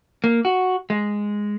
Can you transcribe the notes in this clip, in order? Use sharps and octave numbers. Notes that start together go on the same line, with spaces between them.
A#3
F#4
G#3